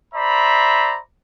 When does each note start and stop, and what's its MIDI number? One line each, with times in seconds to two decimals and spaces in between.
0.14 0.99 72
0.14 0.99 74
0.14 0.99 76
0.14 0.99 82
0.14 0.99 83